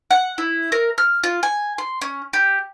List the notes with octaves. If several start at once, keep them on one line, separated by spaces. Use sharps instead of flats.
F#5
E4
A#4
F6
F4
G#5
C6
C#4
G4